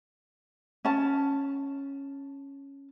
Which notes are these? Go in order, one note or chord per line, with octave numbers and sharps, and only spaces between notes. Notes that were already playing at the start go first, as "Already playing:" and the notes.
C#4 A5